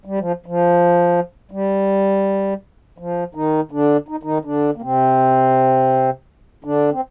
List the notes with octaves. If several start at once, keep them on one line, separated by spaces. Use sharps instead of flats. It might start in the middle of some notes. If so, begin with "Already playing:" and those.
G3
F3
F3
G3
F3
D#3 D#4
D3 D4
D#4
D#3 D#4
D3 D4
A#3
C3 C4
D3 D4
C4